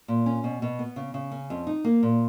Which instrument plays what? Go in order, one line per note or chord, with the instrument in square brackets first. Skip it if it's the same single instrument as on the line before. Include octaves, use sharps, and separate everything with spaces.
[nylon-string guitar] A#2
C#4
B2
B2
B3
C#3
C#3
C#4
F2
D#4
A#3
A#2